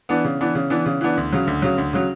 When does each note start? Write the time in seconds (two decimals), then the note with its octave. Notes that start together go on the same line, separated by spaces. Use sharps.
0.09 E3 B3 D4
0.25 C#3
0.41 E3 B3 D4
0.55 C#3
0.70 E3 B3 D4
0.86 C#3
1.01 E3 B3 D4
1.17 D2
1.33 C#3 F#3
1.47 D2
1.62 C#3 F#3
1.78 D2
1.93 C#3 F#3